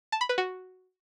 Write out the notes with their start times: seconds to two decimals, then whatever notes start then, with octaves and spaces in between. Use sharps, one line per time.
0.12 A5
0.21 B5
0.29 B4
0.38 F#4